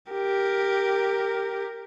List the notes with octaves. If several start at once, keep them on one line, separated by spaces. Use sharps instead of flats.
G4 A#4